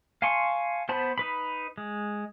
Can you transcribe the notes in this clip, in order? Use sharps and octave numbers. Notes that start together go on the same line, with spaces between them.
F5 G#5 A5 C6 C#6
B3 C5 A5 B5
D#4 B4 B5
G#3